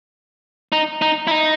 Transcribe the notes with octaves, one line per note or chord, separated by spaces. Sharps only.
D#4
D#4
E4
D#4